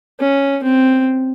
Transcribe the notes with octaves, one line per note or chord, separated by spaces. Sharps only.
C#4
C4